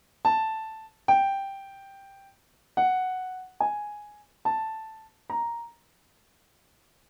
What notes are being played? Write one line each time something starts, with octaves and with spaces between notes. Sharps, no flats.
A5
G5
F#5
G#5
A5
A#5